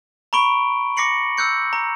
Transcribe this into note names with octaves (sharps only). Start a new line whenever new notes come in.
A#5 B5 C#6 D7 G7
D6 A#6 C7 C#7 F#7
E6 F#6 G6 C#7
A#5